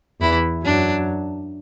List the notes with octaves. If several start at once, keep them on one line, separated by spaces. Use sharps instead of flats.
E2 E3 E4
F#2 F#3 D4